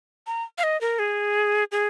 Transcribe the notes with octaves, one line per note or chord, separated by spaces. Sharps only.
A#5
F5
D#5
A#4
G#4
G#4